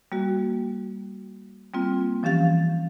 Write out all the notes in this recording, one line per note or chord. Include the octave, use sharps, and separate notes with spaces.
G3 A#3 F#4
G3 A#3 C4 F4
E3 F3 C#4 G4 F5 A6